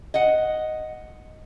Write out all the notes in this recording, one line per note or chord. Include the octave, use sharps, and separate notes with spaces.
D#5 F#5